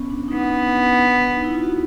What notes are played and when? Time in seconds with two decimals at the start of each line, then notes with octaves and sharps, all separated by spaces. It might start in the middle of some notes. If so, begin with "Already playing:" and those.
Already playing: B3 C#4
0.10 D4
0.28 D#4
0.33 B3 D4
1.36 D#4
1.44 E4
1.54 F4
1.63 F#4